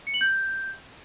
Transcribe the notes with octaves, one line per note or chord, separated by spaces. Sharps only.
C#7
F#7
G6